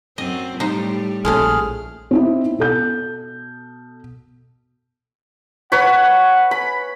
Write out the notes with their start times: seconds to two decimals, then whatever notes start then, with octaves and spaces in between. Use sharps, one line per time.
0.18 F#2 C4 D#5
0.60 A2 G3 D#4 C5
1.25 A#1 A#2 G#3 A3 C#4 G#4 F6
2.11 C4 D#4 E4
2.59 B2 A4 G6
5.72 B4 C#5 F#5 B5
6.51 B5